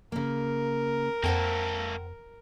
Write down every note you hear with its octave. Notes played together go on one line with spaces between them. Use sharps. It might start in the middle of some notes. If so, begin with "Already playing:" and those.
C#3 A#3 A#4
F2 A#3 A4 C5 F#5 G5